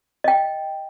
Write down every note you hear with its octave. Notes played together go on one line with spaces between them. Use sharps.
D#5 G5